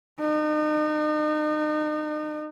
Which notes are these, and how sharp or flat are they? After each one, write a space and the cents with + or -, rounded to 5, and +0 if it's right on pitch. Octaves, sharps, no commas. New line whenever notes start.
D#4 -35